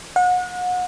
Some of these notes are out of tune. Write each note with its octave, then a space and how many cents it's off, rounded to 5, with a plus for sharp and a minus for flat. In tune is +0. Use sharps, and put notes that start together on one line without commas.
F#5 -35